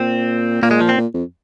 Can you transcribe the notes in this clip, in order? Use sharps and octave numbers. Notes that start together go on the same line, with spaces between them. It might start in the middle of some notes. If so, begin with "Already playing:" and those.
Already playing: A#2 C4
A#2 A#3
G#3
F3
C4
A#2
F2